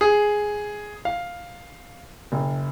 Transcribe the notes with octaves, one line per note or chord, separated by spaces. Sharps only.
G#4
F5
F#1